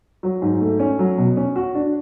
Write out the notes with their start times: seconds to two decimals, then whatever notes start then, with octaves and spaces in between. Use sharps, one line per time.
0.23 F#3
0.42 G#2
0.61 A3
0.79 C#4
0.99 F#3
1.18 B2
1.37 C#4
1.56 F#4
1.75 D4